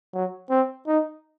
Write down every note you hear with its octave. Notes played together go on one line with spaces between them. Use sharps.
F#3
C4
D#4